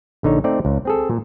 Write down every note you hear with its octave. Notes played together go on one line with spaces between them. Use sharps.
A#1 D3 D#4 C#5
A3 C4 D#4 D5
C#2
C4 G#4 A4
A#2